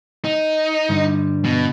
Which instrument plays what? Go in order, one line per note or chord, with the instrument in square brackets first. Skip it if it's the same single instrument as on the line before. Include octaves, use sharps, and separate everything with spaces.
[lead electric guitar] D#4
[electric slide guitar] G2 D3 G3
[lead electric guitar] B2